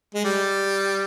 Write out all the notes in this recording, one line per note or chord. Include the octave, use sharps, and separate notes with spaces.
G#3
G3